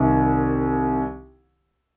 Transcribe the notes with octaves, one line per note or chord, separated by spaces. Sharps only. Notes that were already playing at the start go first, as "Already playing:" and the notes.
Already playing: C2 C3 D#3